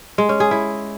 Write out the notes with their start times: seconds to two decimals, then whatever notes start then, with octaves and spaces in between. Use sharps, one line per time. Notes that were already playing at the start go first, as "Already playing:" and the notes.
0.18 G#3
0.29 C#4
0.40 G#4
0.51 E4